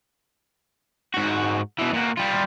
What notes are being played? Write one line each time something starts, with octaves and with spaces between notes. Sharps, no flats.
G#2 F#4
B2 E3
A#2 F#4
G3 F4